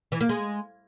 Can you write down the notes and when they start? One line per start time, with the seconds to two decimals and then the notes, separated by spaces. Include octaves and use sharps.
0.12 E3
0.21 A#3
0.29 G#3